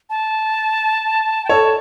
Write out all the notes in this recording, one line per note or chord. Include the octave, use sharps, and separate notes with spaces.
A5
G5
A4 C#5 A5